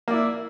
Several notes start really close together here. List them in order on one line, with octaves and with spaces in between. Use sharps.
A#3 D5 E4